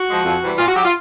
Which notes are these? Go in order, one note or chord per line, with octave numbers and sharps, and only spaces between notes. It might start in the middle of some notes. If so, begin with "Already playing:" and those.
Already playing: F#4
F3 G#3
F2
C3 E3 G3
A#2 F4
F#4
F#3 G4
F4